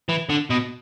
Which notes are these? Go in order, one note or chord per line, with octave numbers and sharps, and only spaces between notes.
E3
D3
B2